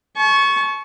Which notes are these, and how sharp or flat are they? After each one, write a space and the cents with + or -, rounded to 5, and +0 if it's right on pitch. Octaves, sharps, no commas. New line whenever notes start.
A5 -40 C#6 +0